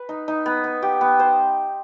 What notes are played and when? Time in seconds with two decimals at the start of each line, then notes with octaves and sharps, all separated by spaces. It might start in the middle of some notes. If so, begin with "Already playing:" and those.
Already playing: B4
0.09 D#4
0.28 D#4
0.46 B3
0.64 B3
0.82 G4
1.01 B3
1.20 C5